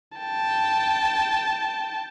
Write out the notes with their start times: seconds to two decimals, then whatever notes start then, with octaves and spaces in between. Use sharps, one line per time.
0.18 G5 A5